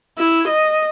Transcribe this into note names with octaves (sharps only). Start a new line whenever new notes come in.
E4
D#5